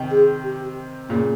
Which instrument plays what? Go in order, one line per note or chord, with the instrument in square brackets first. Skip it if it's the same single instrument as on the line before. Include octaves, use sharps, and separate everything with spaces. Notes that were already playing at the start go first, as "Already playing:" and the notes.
Already playing: [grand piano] C3 D#3
[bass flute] G#4
G4
[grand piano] A#2 C#3 [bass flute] A#3